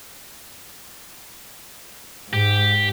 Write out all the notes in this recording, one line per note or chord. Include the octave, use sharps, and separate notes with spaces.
G#2 G4